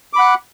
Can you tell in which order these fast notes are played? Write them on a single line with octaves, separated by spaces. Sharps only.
D6 B5 F#5 F#6